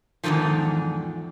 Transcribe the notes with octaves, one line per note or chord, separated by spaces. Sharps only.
E2 G#2 B2 D3 D#3 F3